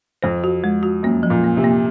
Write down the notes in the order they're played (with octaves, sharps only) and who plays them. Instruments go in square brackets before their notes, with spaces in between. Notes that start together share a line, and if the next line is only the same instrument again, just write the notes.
[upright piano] F2 [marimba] C5
[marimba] F#4
G#3
F#4
[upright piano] F#2 [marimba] A#3
[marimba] F3
[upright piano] A#2
[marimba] A#3
[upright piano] C3
[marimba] A#3